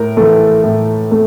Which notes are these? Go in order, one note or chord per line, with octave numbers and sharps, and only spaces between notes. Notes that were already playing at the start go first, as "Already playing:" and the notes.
Already playing: A2 A#4
E3 A3
A2
A3